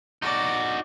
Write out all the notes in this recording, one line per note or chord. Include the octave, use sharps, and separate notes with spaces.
D#4 F#4 D5